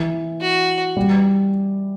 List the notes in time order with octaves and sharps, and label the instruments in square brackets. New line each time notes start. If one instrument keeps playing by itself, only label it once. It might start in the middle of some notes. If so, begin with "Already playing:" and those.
Already playing: [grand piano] E3
[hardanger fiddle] F#4
[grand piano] G3